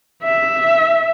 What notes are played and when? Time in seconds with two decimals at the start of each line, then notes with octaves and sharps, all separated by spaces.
0.23 E5